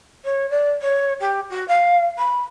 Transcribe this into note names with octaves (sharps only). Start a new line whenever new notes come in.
C#5
D5
C#5
G4
F#4
F5
B5